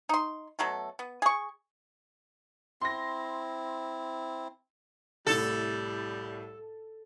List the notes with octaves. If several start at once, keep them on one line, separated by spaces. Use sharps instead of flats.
D#4 C6
B2 F#3 A3 A4
B3
G#4 C#6
C4 E4 C6 A#6
C2 A2 G3 A4